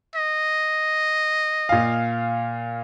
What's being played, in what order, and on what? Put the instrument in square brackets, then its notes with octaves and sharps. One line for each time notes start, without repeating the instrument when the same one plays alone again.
[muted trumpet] D#5
[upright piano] A#2 F5